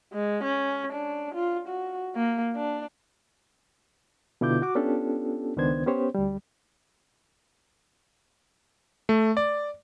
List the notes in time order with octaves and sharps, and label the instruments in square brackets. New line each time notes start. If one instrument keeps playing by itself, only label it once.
[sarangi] G#3
C#4
D4
F4
F#4
A#3
D4
[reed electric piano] B2 D3 E4 F4 D6 G6
F#4 D6
B3 C#4 D4 F4 G4 A4
C#2 D#3 B3 D4 C5 G#6
B3 C#4 G4 C5 C#5
D2 G3
[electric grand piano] A3
D5